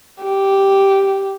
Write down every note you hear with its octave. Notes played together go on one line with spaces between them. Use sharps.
G4